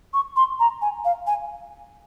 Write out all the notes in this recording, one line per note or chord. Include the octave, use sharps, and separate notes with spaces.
C#6
C6
A#5
G#5
F5
G#5